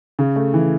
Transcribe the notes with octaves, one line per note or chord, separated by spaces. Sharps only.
C#3
A3
E3